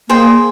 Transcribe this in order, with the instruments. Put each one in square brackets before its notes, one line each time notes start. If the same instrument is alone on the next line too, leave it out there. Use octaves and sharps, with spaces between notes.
[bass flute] A#3 [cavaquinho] G#4 C5 D#5 G5